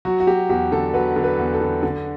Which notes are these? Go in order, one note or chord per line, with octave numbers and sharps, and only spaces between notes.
F#3 F#4
F#4
F#3 G4
E2 G4
D3 A4
F#3 B4
D3
B4
E2
A4
D3
D3